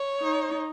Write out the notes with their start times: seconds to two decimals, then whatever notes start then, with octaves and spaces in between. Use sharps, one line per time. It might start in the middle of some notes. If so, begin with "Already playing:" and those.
Already playing: C#5
0.20 D#4